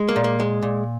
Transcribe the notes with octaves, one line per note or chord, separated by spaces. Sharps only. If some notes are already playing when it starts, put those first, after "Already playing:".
Already playing: G#3
A#3
A#2
A#3
G#3
A#2